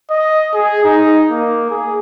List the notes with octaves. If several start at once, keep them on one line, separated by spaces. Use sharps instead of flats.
D#5
G#4
D#4
A#3
G#4